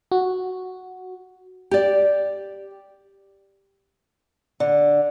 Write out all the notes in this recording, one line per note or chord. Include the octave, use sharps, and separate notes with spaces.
F#4
G4 D5
D3